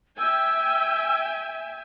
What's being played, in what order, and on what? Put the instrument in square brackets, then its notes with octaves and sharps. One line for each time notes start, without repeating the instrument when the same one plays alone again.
[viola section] E5 G5 G#5 [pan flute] E6